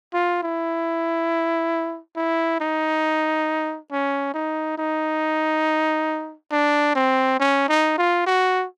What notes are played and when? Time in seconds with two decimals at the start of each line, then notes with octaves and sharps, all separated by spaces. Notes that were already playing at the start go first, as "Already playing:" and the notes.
0.14 F4
0.43 E4
2.16 E4
2.61 D#4
3.91 C#4
4.34 D#4
4.78 D#4
6.52 D4
6.95 C4
7.40 C#4
7.69 D#4
7.98 F4
8.27 F#4